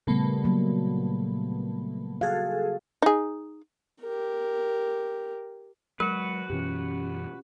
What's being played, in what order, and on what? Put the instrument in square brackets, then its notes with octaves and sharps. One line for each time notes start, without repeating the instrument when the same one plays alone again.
[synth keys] A#2 A3 B3 [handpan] C#3 G3
[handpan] F#3 A#3
[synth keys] F#4 G#4 A4 [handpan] F5
[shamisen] D#4 G#4
[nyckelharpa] G4 A#4
[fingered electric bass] F#3 G#3 [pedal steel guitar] F#4 B4 [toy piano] A#4
[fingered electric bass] F#2 B2 E3 [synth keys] C#4 F4 G4